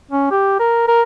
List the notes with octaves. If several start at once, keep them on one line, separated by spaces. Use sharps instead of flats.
C#4
G4
A#4
A#4